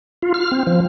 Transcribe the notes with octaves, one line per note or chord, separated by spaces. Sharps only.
F4
F6
C4
F3